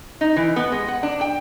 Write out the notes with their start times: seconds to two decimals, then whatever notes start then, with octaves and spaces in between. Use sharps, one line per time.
0.21 D#4
0.37 E3
0.56 B3
0.72 G#3
0.88 F#5
1.03 D4
1.21 G5